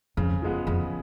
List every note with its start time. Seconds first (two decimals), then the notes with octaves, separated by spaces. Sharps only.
0.17 F2 C#3
0.42 F3 G#3 B3
0.67 F2 C#3